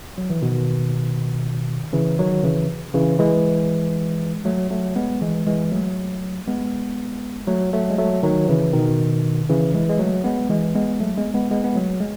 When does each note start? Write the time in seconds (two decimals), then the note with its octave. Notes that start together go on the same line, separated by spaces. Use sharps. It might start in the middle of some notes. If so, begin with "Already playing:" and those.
0.18 F#3
0.30 E3
0.42 B2 D#3
1.93 C#3 E3
2.19 D#3 F#3
2.44 C#3 E3
2.94 C#3 E3
3.19 E3 G#3
4.45 F#3 A3
4.70 F#3 A3
4.96 G#3 B3
5.22 E3 G#3
5.46 E3 G#3
5.71 F#3 A3
6.47 G#3 B3
7.47 F#3 A3
7.73 F#3 A3
7.90 G#3
7.98 F#3 A3
8.23 D#3 F#3
8.48 C#3 E3
8.73 B2 D#3
9.49 C#3 E3
9.74 E3 G#3
9.89 G#3
9.99 F#3 A3
10.24 G#3 B3
10.49 E3 G#3
10.75 G#3 B3
11.00 F#3 A3
11.17 G#3 B3
11.34 G#3 B3
11.50 G#3 B3
11.64 B3
11.75 F#3 A3
12.00 G#3